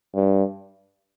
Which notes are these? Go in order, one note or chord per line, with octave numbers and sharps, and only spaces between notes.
G2